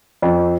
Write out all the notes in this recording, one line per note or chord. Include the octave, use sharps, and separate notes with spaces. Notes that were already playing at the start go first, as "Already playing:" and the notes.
F2